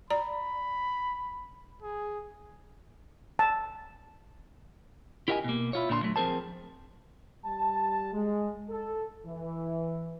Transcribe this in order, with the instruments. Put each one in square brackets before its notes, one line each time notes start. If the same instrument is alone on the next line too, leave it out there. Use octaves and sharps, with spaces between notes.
[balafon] D5 A#5 [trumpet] B5
[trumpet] G#4
[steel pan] A5
[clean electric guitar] E4 G4 A#4 D#5 F5 G#5
B2 A#3
E4 F4 C#5
A#2 D3 D4 A#5 C6
F#3 A3
F3 C4 G#4 A#4 C5 A5
[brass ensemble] G3 A5
G#3
A4
E3